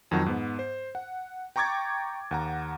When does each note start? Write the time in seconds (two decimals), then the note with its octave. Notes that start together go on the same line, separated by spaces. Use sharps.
0.11 F2 D#3 F#3 F#5 C#6
0.26 G#2 B3
0.59 C5
0.95 F#5
1.56 G5 A#5 C#6 D6 G#6 A6
2.31 D#2 F#5 A#5